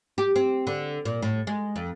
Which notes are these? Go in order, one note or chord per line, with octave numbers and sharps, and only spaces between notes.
G4
C4
D3
A#2
A2
G#3
F2